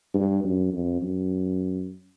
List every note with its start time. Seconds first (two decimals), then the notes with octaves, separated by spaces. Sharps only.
0.14 G2
0.44 F#2
0.73 F2
1.01 F#2